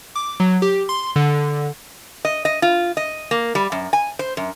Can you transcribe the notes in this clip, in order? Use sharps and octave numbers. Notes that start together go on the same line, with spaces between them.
D6
F#3
G4
C6
D3
D#5
D#5
F4
D#5
A#3
G3
F#2
G#5
C5
F#2